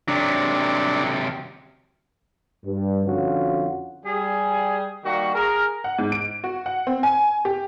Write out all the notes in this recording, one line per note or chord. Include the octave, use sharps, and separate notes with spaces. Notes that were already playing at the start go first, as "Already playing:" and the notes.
C3 F#3 D4
G2
F2 D3 C#4 F4 F#4
G3 G#4
D#3 G3 A#3 F#4
G#4 A#4
F#5
G#2
D7
F#4
F#5
C4
G#5
G4